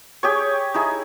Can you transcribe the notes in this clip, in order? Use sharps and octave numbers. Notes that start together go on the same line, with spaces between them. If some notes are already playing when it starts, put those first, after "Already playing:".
G4 G#4 C#5
D#4 E4 G#4